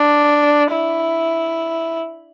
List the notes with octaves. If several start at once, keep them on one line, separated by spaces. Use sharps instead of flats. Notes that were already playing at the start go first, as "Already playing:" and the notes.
Already playing: D4
E4